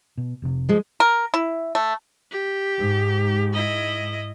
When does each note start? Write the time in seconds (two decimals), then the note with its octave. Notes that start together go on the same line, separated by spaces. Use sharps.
0.17 B2
0.42 F1 A2 C3
0.69 F3 G#3
1.00 A#4
1.34 E4
1.75 A3
2.31 G4
2.78 G#2
3.53 E4 D#5